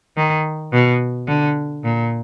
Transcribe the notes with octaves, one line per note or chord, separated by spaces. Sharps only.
D#3
B2
D3
A#2